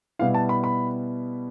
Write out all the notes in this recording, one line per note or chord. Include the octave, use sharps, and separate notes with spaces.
B2 G3 B3 E4 F5
A5
B5
B5